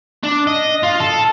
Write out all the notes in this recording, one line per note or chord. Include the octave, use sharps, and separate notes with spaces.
D4
D#5
F4
A4